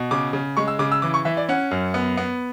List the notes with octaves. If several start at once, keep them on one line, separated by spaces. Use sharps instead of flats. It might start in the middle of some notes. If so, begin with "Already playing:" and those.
Already playing: B2
C#3 D6
C#3
G#3 C#6
E6
C#3 D6
E6
E3 D6
C#6
E3 E5
D5
C#4 F#5
F#2
B3
B3